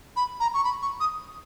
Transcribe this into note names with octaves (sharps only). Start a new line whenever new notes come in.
B5
A#5
C#6
B5
C#6
D#6